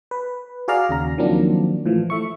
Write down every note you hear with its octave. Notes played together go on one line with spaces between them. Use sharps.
B4
F#4 G#4 D5 F5 A#5 F6
D#2 C#3 A#5
D#3 F3 F#3 A#3 C4 D4
A2 E3 F3
A3 E5 C#6